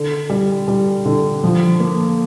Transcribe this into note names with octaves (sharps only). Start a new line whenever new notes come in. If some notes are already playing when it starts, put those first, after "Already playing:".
Already playing: D3
G3
G3
D3
F3
A#3